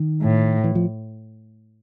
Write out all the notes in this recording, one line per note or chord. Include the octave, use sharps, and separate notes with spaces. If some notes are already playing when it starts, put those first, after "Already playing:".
Already playing: D#3
A2
E3
F3